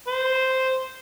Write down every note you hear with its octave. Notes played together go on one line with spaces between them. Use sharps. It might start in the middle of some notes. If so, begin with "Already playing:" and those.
C5